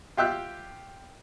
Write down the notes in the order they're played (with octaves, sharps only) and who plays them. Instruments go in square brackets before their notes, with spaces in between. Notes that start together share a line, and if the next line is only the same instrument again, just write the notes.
[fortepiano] F4 G4 E5 F#6